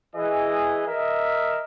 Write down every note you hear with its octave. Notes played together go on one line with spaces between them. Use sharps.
E3 G#4 D#5
A#4 D#5 E5